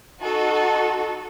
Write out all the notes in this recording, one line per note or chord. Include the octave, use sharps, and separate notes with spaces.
D#4 F#4 A4